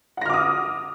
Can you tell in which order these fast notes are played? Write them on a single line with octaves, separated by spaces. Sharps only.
F#5 A#6 F6 D6 D#6